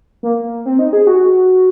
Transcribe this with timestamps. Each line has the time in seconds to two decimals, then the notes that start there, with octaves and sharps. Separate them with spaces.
0.23 A#3
0.66 C4
0.79 D#4
0.93 G#4
1.07 F#4